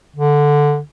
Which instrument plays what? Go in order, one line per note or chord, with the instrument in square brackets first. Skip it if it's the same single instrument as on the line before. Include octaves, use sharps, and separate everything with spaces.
[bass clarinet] D3